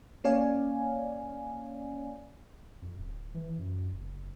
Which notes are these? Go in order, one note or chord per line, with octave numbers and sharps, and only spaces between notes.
A#3 C#4 C#5 D5 F5 G#5
F2
D1
E3
F#2
F#1